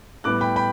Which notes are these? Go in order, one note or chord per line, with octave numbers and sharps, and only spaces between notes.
A2 G3 B3 D6 F#6
G5 B5
G5 B5